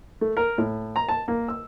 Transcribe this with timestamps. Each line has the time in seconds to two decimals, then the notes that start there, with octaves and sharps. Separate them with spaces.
0.21 A3
0.37 A#4
0.58 A2
0.96 A#5
1.09 A5
1.28 A#3
1.48 E6